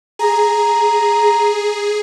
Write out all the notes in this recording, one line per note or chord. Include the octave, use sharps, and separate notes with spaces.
G#4 A#5